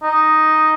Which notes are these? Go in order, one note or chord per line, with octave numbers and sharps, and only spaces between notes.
D#4